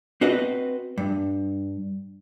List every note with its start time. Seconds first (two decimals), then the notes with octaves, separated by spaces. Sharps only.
0.21 C4 F#4 B4 D#5
0.98 G2